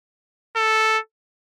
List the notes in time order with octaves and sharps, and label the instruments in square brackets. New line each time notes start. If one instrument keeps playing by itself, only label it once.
[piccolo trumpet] A4